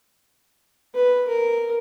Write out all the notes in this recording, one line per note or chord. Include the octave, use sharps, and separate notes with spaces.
B4
A#4